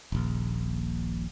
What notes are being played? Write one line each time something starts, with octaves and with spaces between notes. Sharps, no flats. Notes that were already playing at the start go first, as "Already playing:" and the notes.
D#1 A#1